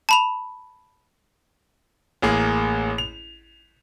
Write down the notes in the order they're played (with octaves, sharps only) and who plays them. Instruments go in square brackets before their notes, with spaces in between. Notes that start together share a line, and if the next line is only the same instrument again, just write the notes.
[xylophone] A5 B5 F7
[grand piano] A1 A#3 G#4
F7